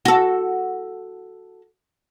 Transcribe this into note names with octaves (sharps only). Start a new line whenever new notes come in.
F#4 A4